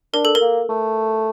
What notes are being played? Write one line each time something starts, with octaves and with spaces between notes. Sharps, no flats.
D4 A#4
A4
A#4
A#3
A3